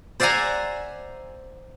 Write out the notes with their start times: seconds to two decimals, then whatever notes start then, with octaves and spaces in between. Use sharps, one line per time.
0.20 C5 D5 E5 F#5 G#5 A#5